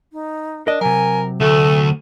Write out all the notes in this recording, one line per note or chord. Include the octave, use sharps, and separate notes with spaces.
D#4
D4 A#4 D#5
C3 F#3 A#4 G#5
D2 A3 A4